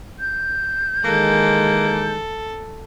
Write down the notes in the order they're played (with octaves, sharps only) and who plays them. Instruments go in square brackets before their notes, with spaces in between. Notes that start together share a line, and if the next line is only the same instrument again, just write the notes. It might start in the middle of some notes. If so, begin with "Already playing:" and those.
[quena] G6
[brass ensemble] D#3 E3 G#3 [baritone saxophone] A#3 [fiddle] A4